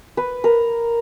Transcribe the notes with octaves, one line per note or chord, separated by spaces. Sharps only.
B4
A#4